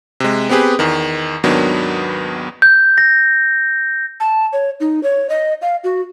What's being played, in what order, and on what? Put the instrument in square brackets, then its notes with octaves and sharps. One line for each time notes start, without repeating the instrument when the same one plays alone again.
[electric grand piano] C3 G#3
B3 C4 G4 G#4 B4
E2 D#3
D#2 G#2 D#3 F#3 B3 D4
[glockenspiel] G6
A#6
[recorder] A5
C#5
D#4
C#5
D#5
F5
F#4